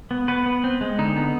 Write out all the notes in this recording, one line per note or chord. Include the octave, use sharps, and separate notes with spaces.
B3
B3 B4
B3
C4
G#3
D3 D#4
B3